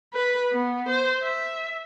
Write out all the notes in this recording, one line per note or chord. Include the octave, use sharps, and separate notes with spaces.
B4
B3
C5
E5